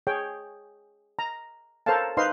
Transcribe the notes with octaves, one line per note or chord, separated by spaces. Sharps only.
G#4 C#5 G5
A#5
A4 A#4 C5 C#5 F5 A5
D#4 B4 C5 D#5 F5 C6